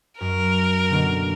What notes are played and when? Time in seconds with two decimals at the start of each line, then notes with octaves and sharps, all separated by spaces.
0.21 F#2 A#4
0.90 B2 D3 A#3